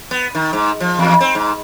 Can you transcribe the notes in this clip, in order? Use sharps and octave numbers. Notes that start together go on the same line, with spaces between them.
B3
D#3
G#2
F3
E2
C4
G#2